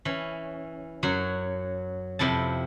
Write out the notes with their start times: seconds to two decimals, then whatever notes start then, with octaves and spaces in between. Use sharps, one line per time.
0.05 E3 C#4
1.03 F#2 F#3 F#4
2.19 F2 C3 E4 A5